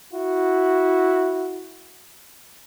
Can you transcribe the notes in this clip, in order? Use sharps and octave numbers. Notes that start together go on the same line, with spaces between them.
E4 F#4